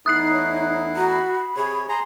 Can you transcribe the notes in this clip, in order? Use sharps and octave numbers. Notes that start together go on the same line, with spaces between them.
E2 A3 D#4 E4 D#6 F#6 C7
C#5
F#4 A#5
B5
C3 G#4 C#5
G#4 A#5 C6